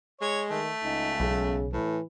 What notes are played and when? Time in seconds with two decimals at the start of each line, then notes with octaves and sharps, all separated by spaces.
0.21 G#3 C#5
0.51 D#3 A3
0.84 C#2 D#4
1.20 B1 C#3
1.73 A2 E3